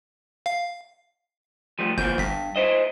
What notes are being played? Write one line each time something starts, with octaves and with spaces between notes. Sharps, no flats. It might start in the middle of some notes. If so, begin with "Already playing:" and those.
F5
F3 G3 A3
G1 A#2 E3 F3 G6
G1 G2 B6
E4 C5 D#5